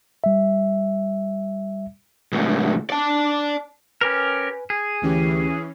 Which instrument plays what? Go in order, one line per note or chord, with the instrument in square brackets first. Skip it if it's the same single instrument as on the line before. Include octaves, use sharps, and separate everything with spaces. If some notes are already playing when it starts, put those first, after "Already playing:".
[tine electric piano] G3 E5
[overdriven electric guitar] C#2 A2
D5 A5
[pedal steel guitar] C#4 G4 A#4 [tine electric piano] B4 G#5
[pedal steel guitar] G#4
[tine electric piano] D2 G4 [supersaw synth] E3 C#4